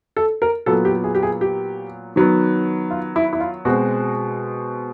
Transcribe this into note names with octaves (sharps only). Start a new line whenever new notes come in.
A4
A#4
A#2 F#3 B3 A4
G4
G#4
G4
G#4
G4
D#3 F#3 B3
F4
E4
E4
F4
B2 G#3 C4 F#4